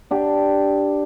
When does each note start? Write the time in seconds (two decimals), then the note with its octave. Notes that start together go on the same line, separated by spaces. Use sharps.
0.11 D4 G4